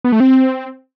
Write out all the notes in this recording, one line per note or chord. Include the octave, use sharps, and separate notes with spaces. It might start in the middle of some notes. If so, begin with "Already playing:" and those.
B3
A3
C4